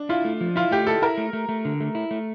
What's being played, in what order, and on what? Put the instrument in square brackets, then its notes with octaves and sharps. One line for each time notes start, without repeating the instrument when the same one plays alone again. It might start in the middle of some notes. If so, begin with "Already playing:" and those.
Already playing: [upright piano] D4
[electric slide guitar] E4 [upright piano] F4
[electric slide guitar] A3
F3
[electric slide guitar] E4 [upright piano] F4
[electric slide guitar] A3 [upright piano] G4
[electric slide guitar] E4 [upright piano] A4
[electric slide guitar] E4 [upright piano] A#4
[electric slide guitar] A3
A3
A3
D3
A3
E4
A3